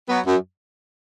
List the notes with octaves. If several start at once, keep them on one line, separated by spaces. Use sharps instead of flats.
F#3 B3
F#2